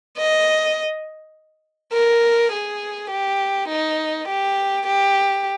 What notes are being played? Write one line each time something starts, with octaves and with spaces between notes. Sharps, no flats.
D#5
A#4
G#4
G4
D#4
G4
G4